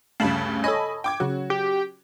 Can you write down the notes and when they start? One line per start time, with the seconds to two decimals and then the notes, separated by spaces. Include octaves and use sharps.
0.20 D2 G2 C#3 F5 A5 B5
0.64 A4 C#5 D#5 G#5 B5
1.04 G5 D6 G#6
1.20 C#3 F#3 F#4
1.50 G4